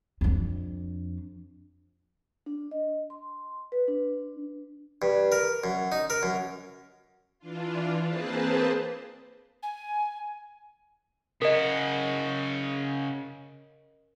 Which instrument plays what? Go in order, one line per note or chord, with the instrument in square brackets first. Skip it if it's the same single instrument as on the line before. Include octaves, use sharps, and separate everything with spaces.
[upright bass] F2 D4
[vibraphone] D4
D#5
C6
B4
D4
[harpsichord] G2
A#4
F#2
D#4
A#4
F#2
[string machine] E3 D4 F4
A#3 C4 G#4 B4 C5 A5
[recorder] G#5
[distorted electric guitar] C#3 F#4 [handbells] A#4 D#5